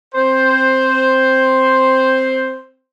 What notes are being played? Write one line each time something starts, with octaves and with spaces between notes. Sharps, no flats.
C4 C5